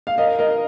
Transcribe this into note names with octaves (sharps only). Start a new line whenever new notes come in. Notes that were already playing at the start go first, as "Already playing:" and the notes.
F5
A#4 D#5
A#4 D#5